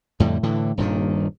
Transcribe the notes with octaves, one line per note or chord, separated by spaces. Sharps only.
F2 A2 D3 G3
A2 D3 E3
D#1 G2 A#2 D#3